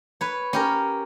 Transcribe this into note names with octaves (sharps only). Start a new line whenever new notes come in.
B4 C#5
C#4 G4 A#4